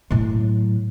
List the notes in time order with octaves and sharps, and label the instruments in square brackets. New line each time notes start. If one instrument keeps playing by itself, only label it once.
[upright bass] A2 F#3